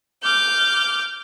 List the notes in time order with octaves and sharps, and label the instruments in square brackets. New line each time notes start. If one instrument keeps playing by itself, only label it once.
[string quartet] D6 F6 G6